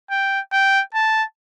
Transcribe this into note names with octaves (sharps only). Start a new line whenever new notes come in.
G5
G5
A5